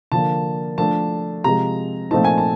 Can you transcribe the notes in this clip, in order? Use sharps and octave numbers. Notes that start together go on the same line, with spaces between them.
D3 F3 A#3 D4 A5
F3 A3 D4 A5
C3 F3 G#3 A#5
A#2 F3 A3 C4 D#4 A5
G#5
A5